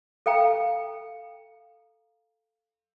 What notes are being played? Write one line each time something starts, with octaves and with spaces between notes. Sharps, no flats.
A4 F5 G5 A#5